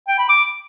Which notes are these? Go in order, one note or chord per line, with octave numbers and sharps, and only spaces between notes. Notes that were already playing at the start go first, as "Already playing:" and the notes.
G5
B5
D6